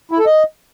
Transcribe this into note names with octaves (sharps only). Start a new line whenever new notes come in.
E4
A4
D#5